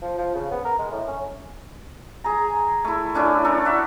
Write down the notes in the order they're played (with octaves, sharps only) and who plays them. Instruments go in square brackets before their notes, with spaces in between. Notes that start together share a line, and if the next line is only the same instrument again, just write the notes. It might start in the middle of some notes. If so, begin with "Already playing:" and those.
[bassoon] F3
F3
C#3
B3
A#4
G#3
A2
C#4
[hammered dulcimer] G#4 A#5
A3 E4
A3 C#4 D4 E4
D4 A4 A#4
F#4 E5